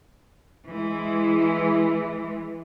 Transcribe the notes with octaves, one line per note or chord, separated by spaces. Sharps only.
E3 G#3